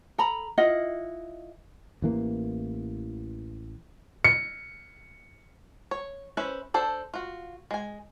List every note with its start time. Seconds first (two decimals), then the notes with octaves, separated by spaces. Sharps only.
0.18 A4 A#5 B5
0.58 E4 F4 D#5 F#5
2.02 A1 E3 A#3
4.24 C#7
5.91 C#5
6.37 C#4 E4 B4 C5
6.74 D4 A4 C5
7.14 F4 F#4
7.71 G#3 G#5